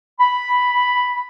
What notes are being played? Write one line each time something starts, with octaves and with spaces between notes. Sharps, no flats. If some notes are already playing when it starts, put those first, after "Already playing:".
B5